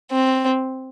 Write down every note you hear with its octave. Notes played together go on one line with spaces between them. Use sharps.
C4